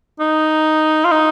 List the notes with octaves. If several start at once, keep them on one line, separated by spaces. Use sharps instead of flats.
D#4
F4
D#4